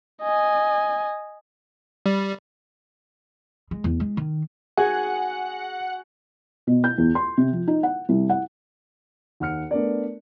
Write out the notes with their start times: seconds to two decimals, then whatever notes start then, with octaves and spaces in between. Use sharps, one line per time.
0.22 D#5 G#5
2.06 G3
3.71 G#3
3.84 E2
4.00 G#3
4.17 D#3
4.77 F#4 G#4 F#5 G#5
6.67 B2
6.84 G6
6.98 E2
7.15 C6
7.37 C3
7.53 F3
7.68 D#4
7.83 F#5
8.09 C2
8.29 F#5
9.40 D#2 F#5 F6 C#7
9.71 A3 B3 D4 A#4 D5